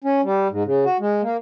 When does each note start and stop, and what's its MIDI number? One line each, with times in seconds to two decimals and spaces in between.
0.04 0.21 61
0.24 0.48 55
0.50 0.63 44
0.65 0.85 49
0.85 0.97 66
1.00 1.22 56
1.22 1.37 58